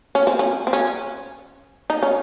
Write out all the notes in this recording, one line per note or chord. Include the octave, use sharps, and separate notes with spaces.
C#4
C4
C#4
C4
C#4
D#4
C#4